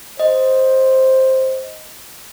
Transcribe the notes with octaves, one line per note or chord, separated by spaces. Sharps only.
C5 D#5